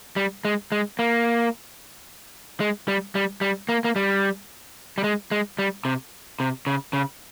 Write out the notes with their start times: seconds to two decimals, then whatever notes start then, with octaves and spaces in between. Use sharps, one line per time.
0.16 G3
0.45 G#3
0.72 G#3
0.99 A#3
2.60 G#3
2.88 G3
3.15 G3
3.41 G3
3.69 A#3
3.84 A#3
3.96 G3
4.98 G3
5.04 G#3
5.31 G#3
5.59 G3
5.85 C3
6.40 C3
6.67 C#3
6.93 C#3